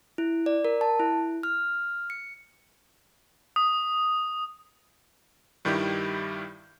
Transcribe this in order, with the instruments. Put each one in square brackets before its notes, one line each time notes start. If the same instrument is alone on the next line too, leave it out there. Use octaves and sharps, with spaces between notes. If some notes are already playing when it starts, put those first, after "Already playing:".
[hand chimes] E4
D5
A#4
A5
E4
F6
C#7
[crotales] D#6
[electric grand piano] G2 D#3 G3 E4 G4 G6